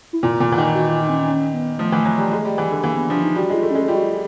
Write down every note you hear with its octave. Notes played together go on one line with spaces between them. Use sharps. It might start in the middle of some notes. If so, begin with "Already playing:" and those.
E4
A#2 F4
A#2
E3
D#3
F#4
F4
D#4
C4
C#4
C#4
B3
F3 A3
E3
F#3
G3
G#3
G3
E3
D3
E3 A#3
B3
F3 D4
D#4
G3 F#4
G#3 F4
A3
G#3 C#4
G3 F4
F#4
F4